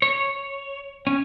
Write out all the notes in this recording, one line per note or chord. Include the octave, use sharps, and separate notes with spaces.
C#5
C#4